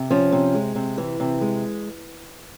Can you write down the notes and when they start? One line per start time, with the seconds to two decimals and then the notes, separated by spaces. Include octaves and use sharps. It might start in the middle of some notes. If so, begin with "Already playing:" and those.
Already playing: C3
0.10 F3 C#4
0.32 C3
0.54 G#3
0.75 C3
0.98 E3
1.20 C3
1.41 G#3